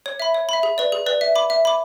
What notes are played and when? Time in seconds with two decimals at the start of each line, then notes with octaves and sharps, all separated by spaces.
0.06 C#5
0.20 E5 B5
0.34 C#5
0.49 E5 B5
0.63 G#4
0.78 B4 D5
0.92 G#4
1.06 B4 D5
1.21 E5
1.35 B5 D6
1.50 E5
1.65 B5 D6